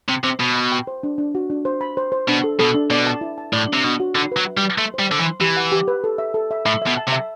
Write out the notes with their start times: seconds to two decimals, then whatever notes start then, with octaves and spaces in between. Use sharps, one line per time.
0.09 C3 G5
0.24 C3 C5
0.40 B2 B5
0.56 B5
0.72 G5
0.87 C5
1.03 D4
1.18 D4
1.35 F#4
1.50 D4
1.65 C5
1.81 B5
1.97 C5
2.12 C5
2.28 B2 D4
2.44 A4
2.59 B2 A4
2.75 D4
2.90 B2 D5
3.07 A5
3.21 E4
3.38 A5
3.53 A2 D5
3.68 D4
3.73 C3
3.84 B2 D4
4.00 F#4
4.15 D3 B5
4.32 F#3 B4
4.46 E5
4.57 G3
4.62 B4
4.78 A3 C6
4.94 C5
4.99 G3
5.09 D3 C5
5.20 E3
5.25 C6
5.41 E3 G4
5.57 F#5
5.72 G4
5.88 B4
6.04 A4
6.18 E5
6.34 A4
6.51 E5
6.66 A2 E5
6.82 E5
6.87 B2
6.97 A5
7.08 C3
7.12 E5